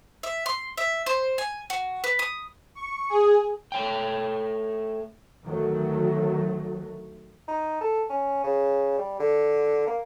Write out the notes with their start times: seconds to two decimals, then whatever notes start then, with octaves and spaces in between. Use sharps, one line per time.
0.23 E5
0.46 C6
0.77 E5
1.06 C5
1.38 G#5
1.70 F#4
2.04 B4
2.19 D#6
2.75 C#6
3.10 G#4
3.72 A3 C#5 G5
5.44 D2 D#3 F#3 A3
7.48 D#4
7.81 A4
8.09 C#4
8.44 C#3
8.98 G3
9.20 D3
9.87 A#3